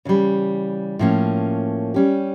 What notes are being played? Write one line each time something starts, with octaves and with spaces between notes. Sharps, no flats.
C#3 E3 G3
A2 F3 A#3 C#4
G3 C#4 G4